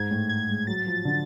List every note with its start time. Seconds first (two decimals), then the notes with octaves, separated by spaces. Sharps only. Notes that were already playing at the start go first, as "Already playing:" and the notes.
Already playing: G#2 G#6
0.11 A2
0.29 G#6
0.49 G#3
0.67 F#3 A6
0.86 F3
1.05 D3